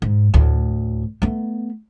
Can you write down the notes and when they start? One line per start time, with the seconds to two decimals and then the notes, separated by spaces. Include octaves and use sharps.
0.02 G#2
0.34 D2 A2
1.22 A3 B3